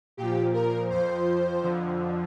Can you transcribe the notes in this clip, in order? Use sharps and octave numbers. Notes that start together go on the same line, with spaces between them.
A#2 F3 G4
A#4
F2 F3 C5
F2 D3 F3